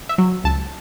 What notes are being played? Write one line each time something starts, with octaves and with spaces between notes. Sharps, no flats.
E5
F#3
C#2 A5